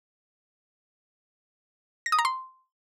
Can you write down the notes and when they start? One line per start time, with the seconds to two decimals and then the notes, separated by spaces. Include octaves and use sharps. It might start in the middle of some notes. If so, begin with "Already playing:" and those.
2.06 A#6
2.12 D#6
2.19 A#5
2.25 C6